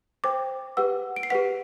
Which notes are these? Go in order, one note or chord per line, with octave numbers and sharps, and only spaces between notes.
C5 G5 D6
G4 B4 F#5 E6
D7
C7
G4 B4 F#5 B6